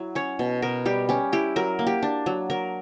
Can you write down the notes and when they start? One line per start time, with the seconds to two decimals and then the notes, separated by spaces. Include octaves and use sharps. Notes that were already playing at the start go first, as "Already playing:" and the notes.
Already playing: F#3 E4
0.15 C#4 C#5
0.39 B2
0.62 B2 A#4
0.86 G3 G4
1.09 C#4 G4
1.32 E4 G4
1.56 F#3 A#4
1.79 A#3
1.87 G4
2.03 D4
2.26 F#3
2.50 F#3 A#4